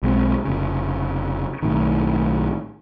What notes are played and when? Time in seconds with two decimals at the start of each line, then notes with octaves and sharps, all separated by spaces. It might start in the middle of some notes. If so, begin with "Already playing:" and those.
0.03 B1 G#3 C4
0.45 F1 C#3
1.63 B1 A2 D#3